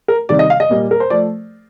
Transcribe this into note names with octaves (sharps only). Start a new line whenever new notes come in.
A#4
C3 D#3 G3 D5
D#5
F5
D#5
A#2 G3 A#3
A#4
C5
F3 A3 D5